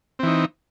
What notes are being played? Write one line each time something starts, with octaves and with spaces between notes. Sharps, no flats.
E3 C4 D#4